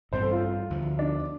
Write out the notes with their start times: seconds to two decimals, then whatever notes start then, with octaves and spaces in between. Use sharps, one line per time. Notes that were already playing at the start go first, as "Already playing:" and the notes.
0.12 A1 G2 G3 C4 C5
0.22 A4
0.31 F4
0.70 D2 D3 F3
0.99 D4